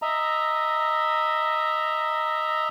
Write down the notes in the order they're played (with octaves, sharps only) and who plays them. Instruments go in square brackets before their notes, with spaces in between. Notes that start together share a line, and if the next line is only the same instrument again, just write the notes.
[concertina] D#5 E5 A#5